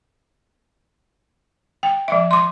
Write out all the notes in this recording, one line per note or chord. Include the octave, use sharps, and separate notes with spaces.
G5
F3 E5
C6 D6